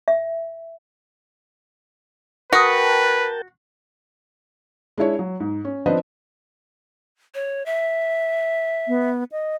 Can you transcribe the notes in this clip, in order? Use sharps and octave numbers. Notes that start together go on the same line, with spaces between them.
E5
F#4 A#4 B4 G5 A5 D#6 A#6
G#3 D4 E4 C#5
F#3
G#2
C#4
F3 C4 D4 B4 C5 D#5
C#5
E5
B3
D#5